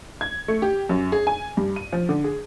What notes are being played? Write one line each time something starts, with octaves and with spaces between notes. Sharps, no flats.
G#6
A3
G4
F#2
G#4
G#5
G2
D#7
F3
D3
G#4